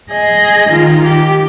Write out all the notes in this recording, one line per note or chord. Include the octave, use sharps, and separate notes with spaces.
G#4 D#5
D#3 F4
G4